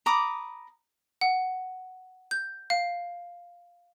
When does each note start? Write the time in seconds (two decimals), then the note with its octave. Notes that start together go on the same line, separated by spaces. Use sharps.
0.06 A#5 B5 D6 D#6
1.21 F#5
2.31 G6
2.70 F5